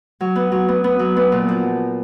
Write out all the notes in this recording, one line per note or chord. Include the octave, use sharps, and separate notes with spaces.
F#3
B3
F#3
B3
B3
F#3
B3
A#2
F3